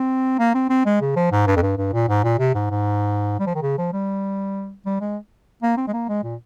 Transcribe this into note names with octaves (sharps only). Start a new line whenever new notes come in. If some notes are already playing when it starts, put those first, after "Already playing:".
Already playing: C4
A#3
C4
C4
G#3
C#3
F3
G#2
G2
F2
G2
G2
A#2
G#2
A#2
C3
G#2
G#2
G3
F3
D#3
C#3
F3
G3
G3
G#3
A#3
C4
G#3
A#3
G#3
A#2